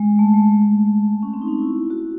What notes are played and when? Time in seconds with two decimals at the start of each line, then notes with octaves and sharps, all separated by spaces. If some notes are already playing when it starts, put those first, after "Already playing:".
Already playing: G#3
0.19 A3
0.34 G#3
0.48 G#3
0.62 A3
1.23 C#4
1.34 C4
1.42 D#4
1.48 C#4
1.62 E4
1.90 F#4